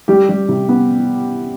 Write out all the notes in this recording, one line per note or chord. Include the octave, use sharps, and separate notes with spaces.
G3 G4
G3
C3
B3